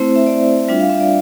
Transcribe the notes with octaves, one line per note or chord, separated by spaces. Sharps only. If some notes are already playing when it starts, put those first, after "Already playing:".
Already playing: A3 C4 E4 C5
E5
D5
G3 D4 F4 E5
F5
E5
D5